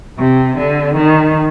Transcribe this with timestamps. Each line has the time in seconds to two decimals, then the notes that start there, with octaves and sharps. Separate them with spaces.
0.19 C3
0.57 D3
0.96 D#3